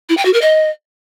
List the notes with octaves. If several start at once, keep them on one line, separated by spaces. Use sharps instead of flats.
E4
G5
F#4
A#4
D#5